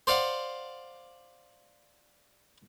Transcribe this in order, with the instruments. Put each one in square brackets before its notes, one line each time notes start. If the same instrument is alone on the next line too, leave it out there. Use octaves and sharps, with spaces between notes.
[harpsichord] C5 D5 F5 F#5